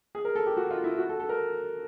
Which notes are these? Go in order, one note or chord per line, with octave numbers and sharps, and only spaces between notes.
G#4
A#4
A4
G4
F#4
F4
E4
F#4
A4
A4
A#4